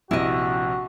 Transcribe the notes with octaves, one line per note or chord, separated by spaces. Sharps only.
A#1 C3 E4 F#4 D#5